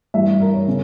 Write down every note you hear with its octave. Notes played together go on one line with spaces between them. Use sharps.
G2 E3 G3 E5
A#4
C#5
C#3